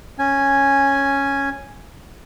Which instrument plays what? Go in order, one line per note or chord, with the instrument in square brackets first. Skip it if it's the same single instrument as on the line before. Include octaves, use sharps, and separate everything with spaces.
[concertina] C#4 G#5